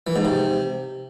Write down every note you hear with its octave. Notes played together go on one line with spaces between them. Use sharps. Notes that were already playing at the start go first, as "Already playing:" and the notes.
E3
G#2
C3